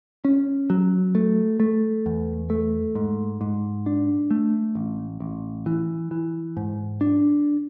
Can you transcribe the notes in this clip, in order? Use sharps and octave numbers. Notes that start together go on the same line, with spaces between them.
C#4
F#3
A3
A3
E2
A3
G#2
G#2
D4
A3
A1
A1
E3
E3
G#2
D4